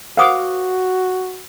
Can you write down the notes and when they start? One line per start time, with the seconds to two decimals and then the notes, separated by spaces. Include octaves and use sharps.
0.17 F#4 A#4 C5 F5 F#5 D6 D#6